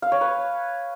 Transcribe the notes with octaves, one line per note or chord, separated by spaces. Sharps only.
F5
C#5
B4